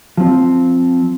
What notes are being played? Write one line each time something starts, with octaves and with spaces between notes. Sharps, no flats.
F3 C4